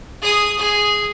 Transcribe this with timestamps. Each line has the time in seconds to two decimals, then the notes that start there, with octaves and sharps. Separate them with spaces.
0.22 G#4 D#6
0.59 G#4